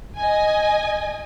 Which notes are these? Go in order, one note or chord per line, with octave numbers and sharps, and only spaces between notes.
D#5 G#5